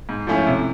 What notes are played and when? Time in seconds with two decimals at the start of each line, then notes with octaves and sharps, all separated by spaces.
0.09 G#2
0.27 F3 A3 C#4 E4
0.46 C3